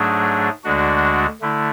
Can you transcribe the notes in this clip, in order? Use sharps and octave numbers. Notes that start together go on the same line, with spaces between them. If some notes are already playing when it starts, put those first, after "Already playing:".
Already playing: G#2 F#3 A3 D4 G#4
D2 D3 G#3 D4 F#4
D3 A3 E4